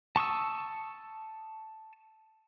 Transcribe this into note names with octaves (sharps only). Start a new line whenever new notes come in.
A5 C#6 D#6 E6